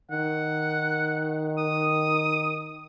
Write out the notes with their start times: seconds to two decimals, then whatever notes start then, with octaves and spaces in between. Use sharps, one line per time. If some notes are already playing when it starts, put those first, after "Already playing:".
0.11 D#3 F#5
1.58 D#6